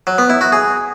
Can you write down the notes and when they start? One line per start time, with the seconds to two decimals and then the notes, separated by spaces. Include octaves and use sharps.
0.07 F#3
0.18 B3
0.30 E4
0.41 F#4
0.52 G#4